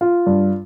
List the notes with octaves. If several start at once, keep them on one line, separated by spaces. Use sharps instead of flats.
F4
G2